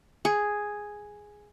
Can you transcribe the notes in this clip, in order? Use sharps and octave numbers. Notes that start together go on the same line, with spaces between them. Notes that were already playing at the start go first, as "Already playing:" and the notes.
G#4